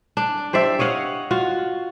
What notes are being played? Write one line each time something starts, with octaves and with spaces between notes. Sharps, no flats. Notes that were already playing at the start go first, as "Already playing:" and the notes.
D4
G4 C5 D5 E5
C#5 D#5 F5 F#5
F4 F#4